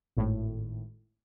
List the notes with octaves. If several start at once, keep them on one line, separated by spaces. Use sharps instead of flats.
G#1 A2